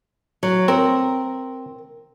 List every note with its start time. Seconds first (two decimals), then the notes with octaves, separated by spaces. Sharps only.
0.43 F#3
0.68 C4 A#4